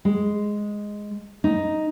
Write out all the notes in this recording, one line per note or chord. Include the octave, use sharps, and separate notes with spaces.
G#3
D#4